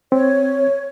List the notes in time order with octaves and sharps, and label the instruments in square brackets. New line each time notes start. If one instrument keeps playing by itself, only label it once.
[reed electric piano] C4 [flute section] C#5